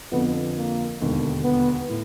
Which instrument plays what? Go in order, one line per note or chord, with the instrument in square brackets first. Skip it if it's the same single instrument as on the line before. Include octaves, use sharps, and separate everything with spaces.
[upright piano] F2 D3 F3 [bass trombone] B3
[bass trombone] A#3
[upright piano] E1 D#2 D3
[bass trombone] B3
[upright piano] A2